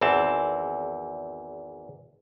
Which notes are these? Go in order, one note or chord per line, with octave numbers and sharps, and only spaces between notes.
G#1 E2 E3 C4 A5